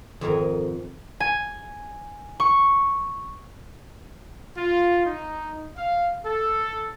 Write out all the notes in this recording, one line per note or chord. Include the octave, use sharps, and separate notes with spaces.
F2 G#2 D#3 G#4 A#4 G#5
G#5
C#6
F4
D#4
F5
A4